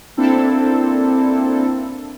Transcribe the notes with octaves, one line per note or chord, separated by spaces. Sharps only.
A#3 C4 D4 E4 A4